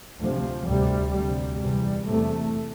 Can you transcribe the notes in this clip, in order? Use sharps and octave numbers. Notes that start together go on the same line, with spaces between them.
D2 C3 F3
D2 C3 G3
D2 C3 G3
E2 C3 G3
E2 C3 A3